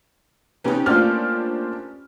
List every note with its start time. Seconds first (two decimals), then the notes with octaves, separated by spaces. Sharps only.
0.64 C3 B3 C#4 D#4 G4
0.86 A3 A#3 D4 F4 C5 D5 F5 F6